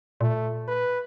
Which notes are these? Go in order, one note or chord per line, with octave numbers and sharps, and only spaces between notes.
A#2 A3
B4